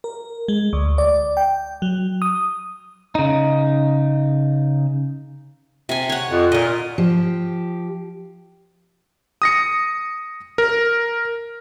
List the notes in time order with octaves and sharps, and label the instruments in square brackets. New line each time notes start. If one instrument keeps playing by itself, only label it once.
[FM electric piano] A#4
G#3
D2
D5
G5
F#3
D#6
[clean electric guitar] C#3 D#4
[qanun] C3 G#5
C#5 F#5
[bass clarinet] F2 [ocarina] F4
[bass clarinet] A#2 [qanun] A#4 D#5
[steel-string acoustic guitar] F3 G4
[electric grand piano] D#6 A#6 C#7
A#4